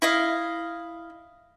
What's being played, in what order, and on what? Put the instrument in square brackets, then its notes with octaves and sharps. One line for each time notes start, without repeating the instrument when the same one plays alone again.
[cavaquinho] E4 D#5 F5